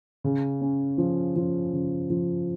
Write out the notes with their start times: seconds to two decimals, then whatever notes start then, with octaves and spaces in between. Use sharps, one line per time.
0.24 C#3
0.61 C#4
0.98 F3
1.36 F3
1.73 C#3
2.10 F3